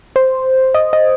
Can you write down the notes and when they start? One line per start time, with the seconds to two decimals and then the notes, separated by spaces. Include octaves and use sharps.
0.16 C5
0.74 D#5
0.93 D#5